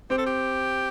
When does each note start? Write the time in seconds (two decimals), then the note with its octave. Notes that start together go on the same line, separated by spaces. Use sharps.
0.10 C4 G4
0.18 A4
0.26 G4